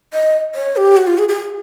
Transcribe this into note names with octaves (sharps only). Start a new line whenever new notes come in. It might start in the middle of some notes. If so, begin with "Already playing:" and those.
D#5
C#5
G4
F#4
F4
G#4
G#4